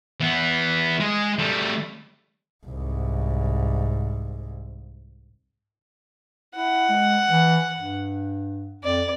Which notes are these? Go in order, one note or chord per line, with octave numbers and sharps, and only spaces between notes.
E3 B3
G#3 G#4
G3 A3
C2 G#2
E4 F#5
G#3
E3
G2
F2 D5